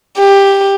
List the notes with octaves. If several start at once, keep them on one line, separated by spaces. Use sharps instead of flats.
G4